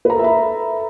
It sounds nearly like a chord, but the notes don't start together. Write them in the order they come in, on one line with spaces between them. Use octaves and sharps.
B4 A#5 A4 E5 B5